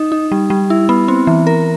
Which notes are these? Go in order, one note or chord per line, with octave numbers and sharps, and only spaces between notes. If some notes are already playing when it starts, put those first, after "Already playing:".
Already playing: D#4
D#4
G3
G3
E4
B3
C4
E3
A#4